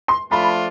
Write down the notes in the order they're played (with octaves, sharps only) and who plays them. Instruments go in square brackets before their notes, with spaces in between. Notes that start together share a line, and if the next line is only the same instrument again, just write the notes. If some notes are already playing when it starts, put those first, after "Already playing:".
[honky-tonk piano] C6
[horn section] F3 A3 D4 F4 [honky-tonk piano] B5